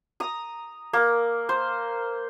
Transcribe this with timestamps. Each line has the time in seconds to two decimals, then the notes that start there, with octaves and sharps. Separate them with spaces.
0.20 A#5 D#6
0.93 A#3
1.49 C5